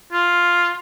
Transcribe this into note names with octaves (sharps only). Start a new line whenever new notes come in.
F4